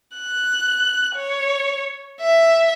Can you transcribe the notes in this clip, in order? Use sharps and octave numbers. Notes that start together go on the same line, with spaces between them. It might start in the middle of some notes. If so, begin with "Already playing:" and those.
F#6
C#5
E5